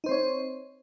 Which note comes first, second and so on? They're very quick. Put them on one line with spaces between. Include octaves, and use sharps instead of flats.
D#4 C5 C4 C#5